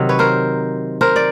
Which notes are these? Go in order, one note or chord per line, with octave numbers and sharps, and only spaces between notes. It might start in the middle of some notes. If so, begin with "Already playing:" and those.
Already playing: C3 D#3 F#3
B4 C#5
A#4 C5
A#4 C5
D5